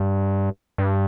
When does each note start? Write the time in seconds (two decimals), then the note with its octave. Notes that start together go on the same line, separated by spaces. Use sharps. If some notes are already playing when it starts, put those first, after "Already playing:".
Already playing: G2
0.78 G2